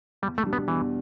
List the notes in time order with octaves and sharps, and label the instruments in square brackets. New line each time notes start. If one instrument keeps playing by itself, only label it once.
[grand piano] E2 [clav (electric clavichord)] G3
[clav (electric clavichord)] A3
[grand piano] B2 G3 D4
[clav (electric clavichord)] B3
[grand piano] E2 [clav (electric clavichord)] E3